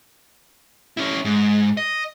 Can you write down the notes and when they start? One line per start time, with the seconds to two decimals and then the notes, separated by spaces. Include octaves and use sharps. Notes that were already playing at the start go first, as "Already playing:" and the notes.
0.97 C#4 E4
1.25 G#2
1.77 D#5